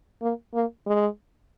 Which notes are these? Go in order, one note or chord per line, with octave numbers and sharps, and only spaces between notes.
A#3
A#3
G#3